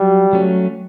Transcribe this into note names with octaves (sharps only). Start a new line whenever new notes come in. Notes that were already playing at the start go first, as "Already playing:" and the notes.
Already playing: F#3 G3
F#3 A3 C#4